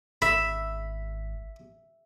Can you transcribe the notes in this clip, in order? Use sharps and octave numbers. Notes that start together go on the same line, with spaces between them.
G#1 E5 B5